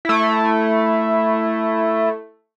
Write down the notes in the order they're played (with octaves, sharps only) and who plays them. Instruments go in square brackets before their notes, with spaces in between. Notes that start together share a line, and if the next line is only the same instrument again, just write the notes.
[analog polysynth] A3 E4